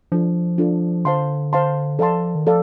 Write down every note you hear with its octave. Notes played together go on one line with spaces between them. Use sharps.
F3 D4 F4 A4
D4 F4 A4
D3 C5 F5 A5 C6
C5 F5 A5 C6
F3 A4 D5 F5 A5 C6
D#3
F3 A4 D5 F5